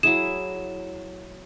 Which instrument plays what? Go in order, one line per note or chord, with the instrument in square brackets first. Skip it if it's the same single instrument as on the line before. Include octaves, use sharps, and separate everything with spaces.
[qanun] F#3 E4 G#4 [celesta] E7